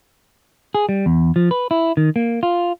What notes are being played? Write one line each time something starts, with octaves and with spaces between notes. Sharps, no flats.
G#4
G3
E2
F3
B4
E4
D#3
A#3
F4